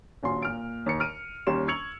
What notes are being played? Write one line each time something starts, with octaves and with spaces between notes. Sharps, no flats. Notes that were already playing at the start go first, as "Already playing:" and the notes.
D#1 A#1 F#4 C6
A#2 F6 D7
D#2 C#7
F6 D7 D#7
D#2 G3 C#4 C6 E7
C#6 E6 G#6 C#7 F7 F#7